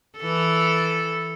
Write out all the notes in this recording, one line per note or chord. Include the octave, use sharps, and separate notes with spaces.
E3 A4